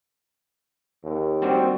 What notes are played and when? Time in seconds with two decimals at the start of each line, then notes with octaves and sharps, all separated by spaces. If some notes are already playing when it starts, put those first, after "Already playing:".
1.04 D#2
1.42 G3 C4 D4 F#4